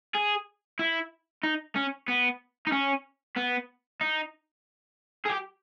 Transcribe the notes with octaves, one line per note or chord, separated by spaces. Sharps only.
G#4
E4
D#4
C#4
B3
D#4
C#4
B3
D#4
G#4
G4